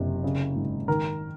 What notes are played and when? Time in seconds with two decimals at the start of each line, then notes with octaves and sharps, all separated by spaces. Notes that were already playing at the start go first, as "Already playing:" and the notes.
Already playing: F#1 C3
0.24 C#3
0.56 G#1
0.88 D#3 A#4